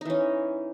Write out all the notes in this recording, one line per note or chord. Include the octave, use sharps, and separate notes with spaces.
E3 C#4 D#4